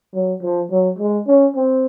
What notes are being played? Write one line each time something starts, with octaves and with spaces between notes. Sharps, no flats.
F#3
F3
F#3
G#3
C#4
C4